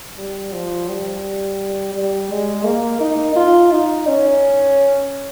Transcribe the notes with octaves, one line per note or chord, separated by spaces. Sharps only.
G3
F3
G3
G3
G#3
A#3
D#4
F4
D#4
C#4